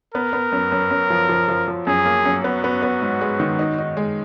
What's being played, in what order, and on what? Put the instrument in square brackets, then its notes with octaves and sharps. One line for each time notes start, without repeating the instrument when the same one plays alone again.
[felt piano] B3 [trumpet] A#4
[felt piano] B3
F#2
F#2
F#2
F3
F3
F3
F3
[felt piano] F#2 [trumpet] G#4
[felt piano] A#3
F#2
[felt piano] B3 [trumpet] F#4
[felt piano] B3
B3
G#2
G#3
D#3
D#4
D#4
G#3